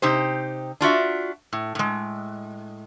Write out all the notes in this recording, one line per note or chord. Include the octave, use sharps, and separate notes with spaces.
C3 D#4 G4 C5
D4 F4 F#4 E5
A2
A2 G#3